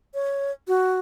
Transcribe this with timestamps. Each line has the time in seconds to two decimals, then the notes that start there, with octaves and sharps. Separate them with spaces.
0.14 C#5
0.68 F#4